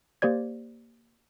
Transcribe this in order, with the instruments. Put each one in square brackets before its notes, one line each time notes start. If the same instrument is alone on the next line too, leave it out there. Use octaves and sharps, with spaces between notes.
[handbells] A#3 G4 C5 D5 G#6